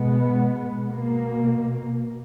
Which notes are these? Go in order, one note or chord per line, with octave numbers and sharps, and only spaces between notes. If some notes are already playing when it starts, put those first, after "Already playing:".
Already playing: B2 G#3 B3
B2 A#3